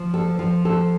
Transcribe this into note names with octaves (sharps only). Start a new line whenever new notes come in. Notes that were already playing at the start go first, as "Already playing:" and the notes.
Already playing: F3
A4
F3
A4